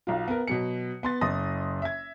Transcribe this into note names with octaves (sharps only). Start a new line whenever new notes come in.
B1 F4
B3 A#4
B2 F#3 C#7
B3 C6 A6
F#1 D#5 C6 D#6 A#6
E5 G#6